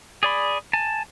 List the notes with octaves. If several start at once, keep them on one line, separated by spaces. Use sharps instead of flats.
G#4 D5 B5
G#5 A5